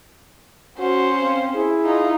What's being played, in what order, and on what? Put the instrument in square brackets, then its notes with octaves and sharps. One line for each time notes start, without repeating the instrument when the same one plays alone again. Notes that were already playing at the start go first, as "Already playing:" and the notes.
[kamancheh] C#4 C5 [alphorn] F#4
[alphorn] C4 [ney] F5
[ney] E4 [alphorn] G#4
[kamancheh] D#4 F4